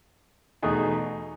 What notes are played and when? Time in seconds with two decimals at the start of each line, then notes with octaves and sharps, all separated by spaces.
0.62 E2 B2 A3 D#4 G#4